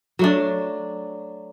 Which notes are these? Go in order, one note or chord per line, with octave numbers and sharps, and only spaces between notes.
F#3 A3 D4